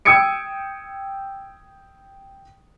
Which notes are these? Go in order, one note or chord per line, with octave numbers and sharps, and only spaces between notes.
G5 D#6 E6 G#6 C#7 D7